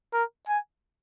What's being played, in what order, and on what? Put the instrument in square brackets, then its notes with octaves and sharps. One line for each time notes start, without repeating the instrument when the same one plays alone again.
[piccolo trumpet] A#4
G#5